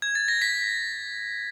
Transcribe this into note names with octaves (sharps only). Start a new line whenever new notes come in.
G#6
A6
A#6
B6